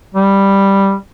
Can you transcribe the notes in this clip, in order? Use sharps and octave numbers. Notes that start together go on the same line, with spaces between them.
G3